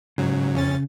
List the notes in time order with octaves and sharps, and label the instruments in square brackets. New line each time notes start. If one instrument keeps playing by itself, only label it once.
[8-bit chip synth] G#2 F#3 [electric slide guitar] C#3
[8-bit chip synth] F2 C#4 A6